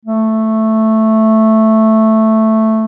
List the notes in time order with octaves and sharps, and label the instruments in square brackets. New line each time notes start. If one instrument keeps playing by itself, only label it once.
[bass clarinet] A3